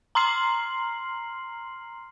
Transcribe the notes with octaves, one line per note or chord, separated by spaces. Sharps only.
A#5 C6 F6 C7 F#7